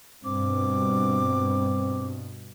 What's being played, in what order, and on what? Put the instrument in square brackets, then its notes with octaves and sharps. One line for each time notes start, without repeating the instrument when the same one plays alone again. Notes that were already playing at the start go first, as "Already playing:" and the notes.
[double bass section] G2 B2 [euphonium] C4 [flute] D6